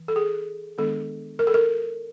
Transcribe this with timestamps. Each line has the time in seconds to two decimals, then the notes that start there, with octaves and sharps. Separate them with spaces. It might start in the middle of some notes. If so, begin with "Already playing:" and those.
Already playing: E3
0.08 A4
0.16 G#4
0.78 D#3 G#3 B3 D4 A4
1.39 A#4
1.47 A4
1.54 A#4